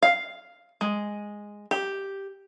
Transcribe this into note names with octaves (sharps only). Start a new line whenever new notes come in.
F5
G#3
G4